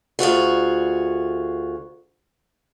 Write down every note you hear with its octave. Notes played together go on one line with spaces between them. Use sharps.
D2 F4 F#4 G#4